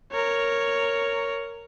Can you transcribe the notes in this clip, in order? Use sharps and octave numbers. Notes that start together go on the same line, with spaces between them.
A#4 C#5